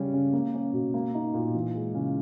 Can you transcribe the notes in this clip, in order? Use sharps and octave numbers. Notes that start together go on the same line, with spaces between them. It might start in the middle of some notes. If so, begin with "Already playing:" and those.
Already playing: C#3 G3 C#4
C#3
A#3
C#4
B2
A#3
D#4
A#2
E3
G#3
C#3